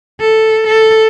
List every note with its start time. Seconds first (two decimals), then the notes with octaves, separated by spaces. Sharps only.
0.21 A4
0.67 A4